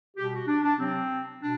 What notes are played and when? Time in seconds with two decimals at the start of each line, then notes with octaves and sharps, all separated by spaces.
0.17 B2 G3 G4
0.32 F#4
0.47 D4
0.63 D4
0.78 C3 F#3 C4
1.41 B2 D4